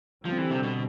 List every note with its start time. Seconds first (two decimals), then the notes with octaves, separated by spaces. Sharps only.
0.25 D3 F3 G3 C4
0.38 E3
0.51 C3
0.63 B2